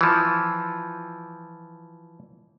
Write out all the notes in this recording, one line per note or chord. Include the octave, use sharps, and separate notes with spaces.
E3 F3